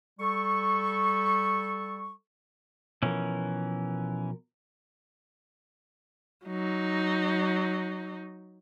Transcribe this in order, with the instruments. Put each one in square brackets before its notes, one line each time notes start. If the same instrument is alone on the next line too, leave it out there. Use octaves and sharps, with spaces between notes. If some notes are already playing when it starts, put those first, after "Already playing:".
[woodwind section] G3 A4 C#6
[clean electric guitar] B2 F3 A#4 [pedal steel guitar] E3 C#4
[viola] F#3 D#4